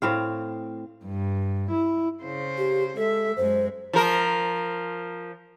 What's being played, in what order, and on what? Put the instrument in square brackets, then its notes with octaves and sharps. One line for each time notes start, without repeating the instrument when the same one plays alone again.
[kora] A2 C4 F5
[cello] G2
E4
C#3 C5
[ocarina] G4
[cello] G#3 E5 [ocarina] A4
[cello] F#2 G#3 [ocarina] C5
[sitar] F3 A#4